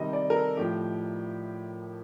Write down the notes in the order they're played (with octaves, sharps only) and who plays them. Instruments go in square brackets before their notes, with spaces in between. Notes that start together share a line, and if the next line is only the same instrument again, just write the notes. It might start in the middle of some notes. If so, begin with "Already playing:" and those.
Already playing: [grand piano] C3 D#3 G3 D#5
D5
A#4
A4
A2 F3 A3 G4